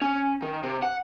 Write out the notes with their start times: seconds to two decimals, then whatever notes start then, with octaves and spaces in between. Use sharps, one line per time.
0.01 C#4
0.42 D#3
0.63 C3
0.82 F#5